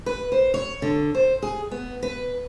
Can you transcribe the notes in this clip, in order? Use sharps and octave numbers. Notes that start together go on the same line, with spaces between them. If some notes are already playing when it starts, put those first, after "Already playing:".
B4
C5
C#5
D3
C5
G#4
B3
B4